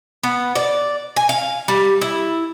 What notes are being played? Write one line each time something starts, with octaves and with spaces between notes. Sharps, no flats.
B3
D5
G#5
F5
G3
E4